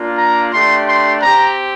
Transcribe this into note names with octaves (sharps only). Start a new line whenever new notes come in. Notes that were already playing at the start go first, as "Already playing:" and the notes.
Already playing: A#3 D4 F4
A#5
A3 D4 G4 C6
C6
C4 G4 A#5